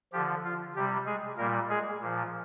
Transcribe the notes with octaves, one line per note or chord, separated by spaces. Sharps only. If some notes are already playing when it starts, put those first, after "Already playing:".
D3 F3 G4
F4
C3 G3 G4
G#3 G#4
A#2 G3 A#3 A#4
G#3 G#4
A#2 F3